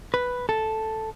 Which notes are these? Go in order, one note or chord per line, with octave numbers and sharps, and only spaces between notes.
B4
A4